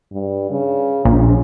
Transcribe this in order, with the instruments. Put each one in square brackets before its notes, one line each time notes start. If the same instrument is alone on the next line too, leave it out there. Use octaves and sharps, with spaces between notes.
[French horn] G2
C#3
[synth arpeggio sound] A#1 [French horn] C#4